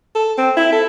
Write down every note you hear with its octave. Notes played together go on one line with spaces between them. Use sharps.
A4
C4
E4
A4